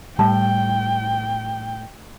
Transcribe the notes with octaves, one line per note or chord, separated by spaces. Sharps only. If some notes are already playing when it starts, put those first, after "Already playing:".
A2 G3 G5 A5